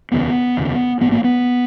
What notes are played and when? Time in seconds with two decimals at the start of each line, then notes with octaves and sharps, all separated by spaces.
0.11 F1 D#2 C#3 B3
0.57 F1 D#2 C#3
1.01 A1 G#2 B3
1.12 A#3
1.24 B3